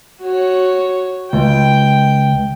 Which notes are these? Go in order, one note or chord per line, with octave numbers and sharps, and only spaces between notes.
F#4 C#5
C#2 G5